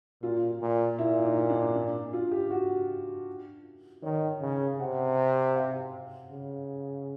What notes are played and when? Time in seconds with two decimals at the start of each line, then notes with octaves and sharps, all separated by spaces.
0.22 A#2 F4
0.62 A#2
0.99 A#2 E4
1.24 D#4
1.49 D4
1.74 D4
2.13 F4
2.31 G4
2.50 F#4
4.03 D#3 C#5
4.41 C#3
4.79 C3 F#5
5.55 F5
6.31 C#3